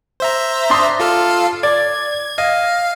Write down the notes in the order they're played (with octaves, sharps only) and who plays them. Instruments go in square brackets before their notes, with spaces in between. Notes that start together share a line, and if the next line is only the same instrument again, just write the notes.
[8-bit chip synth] C5 E5 A#5
[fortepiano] D4 C6 D#6
[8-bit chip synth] F4 A4 F5
[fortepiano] D5 [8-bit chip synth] G#6
[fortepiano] D#5 [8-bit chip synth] F5